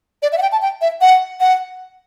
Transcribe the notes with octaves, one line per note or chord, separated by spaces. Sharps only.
D5
E5
F#5
G5
A5
G5
E5
F#5
F#5